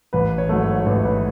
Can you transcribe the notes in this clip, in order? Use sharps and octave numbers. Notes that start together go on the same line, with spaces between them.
A1 B4
C#5
G#2 F#3 A3
C#5
A1 C#5
B4